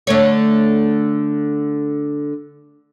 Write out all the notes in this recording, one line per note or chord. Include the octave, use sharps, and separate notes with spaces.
D3 A3 C#5